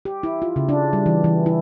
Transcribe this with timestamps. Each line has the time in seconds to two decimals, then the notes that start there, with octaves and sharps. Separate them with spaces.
0.05 G4
0.23 E4
0.42 F4
0.56 C#3
0.69 D4
0.93 G3
1.06 E3
1.24 E3
1.46 E4